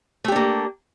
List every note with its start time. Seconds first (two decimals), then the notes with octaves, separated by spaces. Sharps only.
0.24 A3
0.28 G4
0.32 D4
0.36 A#3